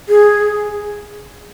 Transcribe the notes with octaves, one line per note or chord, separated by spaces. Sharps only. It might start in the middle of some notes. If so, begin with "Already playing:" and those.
G#4